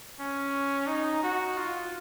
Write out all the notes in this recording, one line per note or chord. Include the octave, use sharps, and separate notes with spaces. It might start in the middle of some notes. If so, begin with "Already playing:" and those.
C#4
D#4
F#4
F4